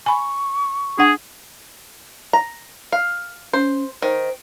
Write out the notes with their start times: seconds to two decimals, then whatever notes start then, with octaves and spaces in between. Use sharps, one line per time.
0.06 G#5 B5 C#6
0.99 D4 G#4 F#5
2.33 A#5
2.92 F5
3.53 C#4 C5
4.02 D#3 C5